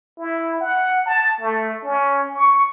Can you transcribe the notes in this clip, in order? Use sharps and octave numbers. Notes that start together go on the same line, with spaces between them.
E4
F#5
A5
A3
C#4
C#6